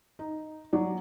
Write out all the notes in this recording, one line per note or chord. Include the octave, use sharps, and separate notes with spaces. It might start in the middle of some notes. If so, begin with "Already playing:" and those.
D#4
F#3 D5